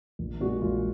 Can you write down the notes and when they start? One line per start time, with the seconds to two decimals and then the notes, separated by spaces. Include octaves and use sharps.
0.19 A#1
0.40 A#2 G#3 F#4
0.62 A#1 F4